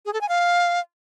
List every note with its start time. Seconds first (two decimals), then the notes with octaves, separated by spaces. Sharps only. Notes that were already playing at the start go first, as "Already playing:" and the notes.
0.06 G#4
0.13 A4
0.21 G#5
0.29 F5